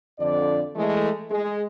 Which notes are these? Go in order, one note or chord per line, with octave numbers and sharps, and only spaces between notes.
F2 D3 D5
E3 G#3 A3
G#3